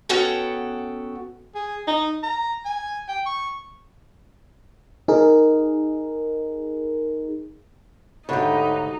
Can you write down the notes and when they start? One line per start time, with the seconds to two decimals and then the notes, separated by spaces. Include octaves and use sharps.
0.09 B3 C#4 F#4 A4 F#5 G5
1.55 G#4
1.87 D#4
2.23 A#5
2.65 G#5
3.08 G5
3.26 C#6
5.08 D#4 G#4 A#4
8.29 D2 G#2 D3 D#4 G4 B4 C#5